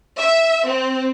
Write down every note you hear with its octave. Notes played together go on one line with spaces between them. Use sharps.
E5
C4